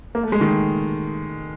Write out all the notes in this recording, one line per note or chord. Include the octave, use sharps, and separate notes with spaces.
A#3
A3
G#3
D#3